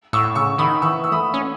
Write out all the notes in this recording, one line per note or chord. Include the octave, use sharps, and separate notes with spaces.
A2 C#6 E6
C#3 C#6 E6
D#3 B5 D#6
E3 C#6 E6
E6
A3 B5 D#6
C#4